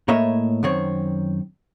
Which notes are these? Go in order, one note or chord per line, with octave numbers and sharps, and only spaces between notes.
A2 A#3 C#5 D#5 E5
F#2 D#3 C4 C#5